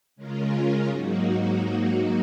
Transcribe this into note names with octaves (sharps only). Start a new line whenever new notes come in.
C#3 G#3 C#4 F4 A#4
G#2 F#3 A#3 D#4 F#4